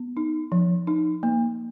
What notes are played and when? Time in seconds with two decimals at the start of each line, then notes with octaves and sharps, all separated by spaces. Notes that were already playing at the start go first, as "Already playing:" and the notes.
Already playing: B3
0.17 D#4
0.52 F3
0.87 D#4
1.23 A#3